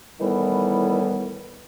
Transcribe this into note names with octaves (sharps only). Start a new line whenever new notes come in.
A2 D#3 E3 G3 B3 E4